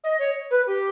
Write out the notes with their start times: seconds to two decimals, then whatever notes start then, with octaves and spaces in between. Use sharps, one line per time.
0.04 D#5
0.19 C#5
0.51 B4
0.66 G4